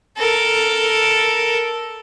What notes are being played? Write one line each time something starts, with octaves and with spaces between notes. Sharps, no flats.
A4 A#4